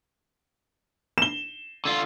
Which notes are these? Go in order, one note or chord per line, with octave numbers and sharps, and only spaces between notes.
E7 G7
D3 F4